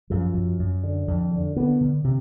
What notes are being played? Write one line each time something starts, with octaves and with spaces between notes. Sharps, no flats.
F#2 F3
F#2
F#2
D3
F2
D3
D3 B3
D3
C3